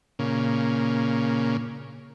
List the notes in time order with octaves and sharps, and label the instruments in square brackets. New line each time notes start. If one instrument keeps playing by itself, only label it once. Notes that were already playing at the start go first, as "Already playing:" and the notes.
[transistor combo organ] A#2 C#3